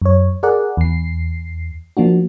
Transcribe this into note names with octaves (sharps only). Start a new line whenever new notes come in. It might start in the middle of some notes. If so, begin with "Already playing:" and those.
F#2 C#5
G#4 A#4 D5 F#5
E2 C7
F3 A#3 D4 F#4